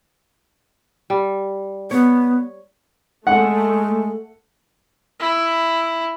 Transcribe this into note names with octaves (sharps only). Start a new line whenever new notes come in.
G3
B3 C#5
G#3 A3 F#5
E4